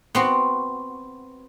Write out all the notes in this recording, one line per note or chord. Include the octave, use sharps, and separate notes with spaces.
B3 C4 F#4